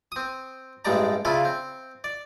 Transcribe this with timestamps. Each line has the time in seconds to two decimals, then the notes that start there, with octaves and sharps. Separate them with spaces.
0.12 C4 D#6
0.85 A1 G2 G#3 D4 D5 A#5
1.25 C#3 D4 E4 F4
1.45 C4
2.04 D5